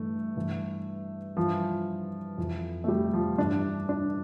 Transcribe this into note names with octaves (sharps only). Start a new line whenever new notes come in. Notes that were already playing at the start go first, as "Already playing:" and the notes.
Already playing: G2 E3 A3
G2 E3
G2 E3 F3
F2 E3
A3
G3
F3
G2 E3 D4
D4